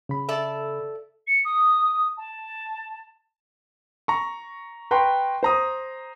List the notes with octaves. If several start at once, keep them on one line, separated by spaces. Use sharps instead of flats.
C#3 B5
A4 D5 E5
C#7
D#6
A5
A#5 C#6
B4 G5 A#5 C6 C#6
C5 A#5 D#6